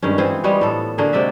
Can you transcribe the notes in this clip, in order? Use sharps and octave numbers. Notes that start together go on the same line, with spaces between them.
G2 D#3 G#3 C#4
E3 C4 F4 G#4
G3 G#3 B3 C#5
A2 A4
D3 A#3 F#4 G#4
C3 G#3 D5 E5